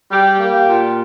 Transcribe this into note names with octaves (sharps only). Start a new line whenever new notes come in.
G3 G4
A#3
A#2